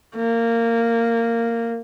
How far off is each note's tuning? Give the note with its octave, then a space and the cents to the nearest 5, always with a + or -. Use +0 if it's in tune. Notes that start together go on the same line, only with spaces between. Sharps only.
A#3 -15